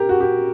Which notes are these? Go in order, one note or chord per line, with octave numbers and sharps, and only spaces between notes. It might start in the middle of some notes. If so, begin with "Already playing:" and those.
Already playing: G4 A#4
F#4
G4